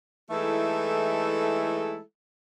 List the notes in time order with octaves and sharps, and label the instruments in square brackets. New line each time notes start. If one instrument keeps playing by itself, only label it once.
[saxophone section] E3 G#3 A3 D#4 E4 A4